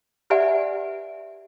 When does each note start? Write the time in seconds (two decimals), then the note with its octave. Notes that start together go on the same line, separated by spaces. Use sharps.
0.30 G4 B4 D5 E5 F#5 G#5